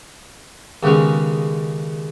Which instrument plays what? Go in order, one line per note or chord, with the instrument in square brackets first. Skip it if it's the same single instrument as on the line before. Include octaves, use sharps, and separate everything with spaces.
[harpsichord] D#2 C#3 G#3 B3 C#4